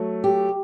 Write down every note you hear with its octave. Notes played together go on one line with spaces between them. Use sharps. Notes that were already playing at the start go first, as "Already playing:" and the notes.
Already playing: F#3 A3
G4